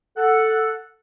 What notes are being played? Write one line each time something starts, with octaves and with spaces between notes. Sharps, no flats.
A4 F#5